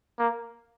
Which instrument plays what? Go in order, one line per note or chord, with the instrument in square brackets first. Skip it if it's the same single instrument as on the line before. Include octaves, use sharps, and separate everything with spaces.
[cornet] A#3